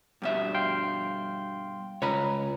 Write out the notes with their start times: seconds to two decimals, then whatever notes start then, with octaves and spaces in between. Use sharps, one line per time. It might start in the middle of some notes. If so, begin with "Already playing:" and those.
0.22 G2 B2 E5
0.55 F5 G5 C6
2.02 C#2 C#5 A#5 B5